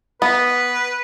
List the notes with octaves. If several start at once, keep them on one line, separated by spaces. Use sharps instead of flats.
B3 B4